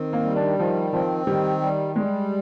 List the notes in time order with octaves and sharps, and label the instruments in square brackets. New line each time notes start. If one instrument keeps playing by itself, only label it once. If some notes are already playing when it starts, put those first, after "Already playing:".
Already playing: [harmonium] D#3 C4
[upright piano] A#3
[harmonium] G3
[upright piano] D4
[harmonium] D#3 [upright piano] F3
[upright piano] F3 [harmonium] C4
[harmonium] D#3 [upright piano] G3
[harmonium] G3
[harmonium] G3 [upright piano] G#3